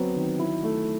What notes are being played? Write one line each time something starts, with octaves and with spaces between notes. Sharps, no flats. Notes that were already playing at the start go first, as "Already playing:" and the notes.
Already playing: F#3 B3 C4
D#3
E4
A3